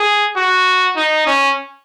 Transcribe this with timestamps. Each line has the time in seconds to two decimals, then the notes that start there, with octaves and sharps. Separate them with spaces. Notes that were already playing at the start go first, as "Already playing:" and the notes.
Already playing: G#4
0.36 F#4
0.96 D#4
1.27 C#4